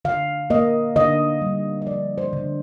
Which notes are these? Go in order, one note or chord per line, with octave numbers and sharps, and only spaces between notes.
D3 F5
A#3 D#5
D3 D#5
G3
D#5
F3 D5
C5
D3